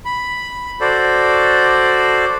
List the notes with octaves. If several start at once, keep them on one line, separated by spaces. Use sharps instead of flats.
B5
F#4 A4 C5 D5